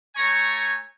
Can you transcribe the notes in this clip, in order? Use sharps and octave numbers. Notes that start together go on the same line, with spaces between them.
A3 C#5 G#5 A#5 C#6